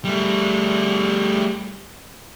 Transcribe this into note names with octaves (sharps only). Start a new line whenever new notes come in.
G3 A3